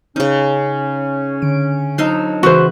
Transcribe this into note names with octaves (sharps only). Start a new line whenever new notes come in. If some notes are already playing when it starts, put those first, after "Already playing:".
C#3 C#4 D#4
D3 D7
F2 F#3 D4 D#4 D#5 C6 E6 F6
C#3 E3 G#3 F#4 B4 C5 E5